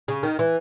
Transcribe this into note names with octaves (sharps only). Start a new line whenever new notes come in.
C#3
D#3
E3